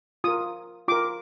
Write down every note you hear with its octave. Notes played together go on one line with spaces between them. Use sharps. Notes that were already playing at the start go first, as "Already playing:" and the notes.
F4 A#4 D#6
F4 A#4 D6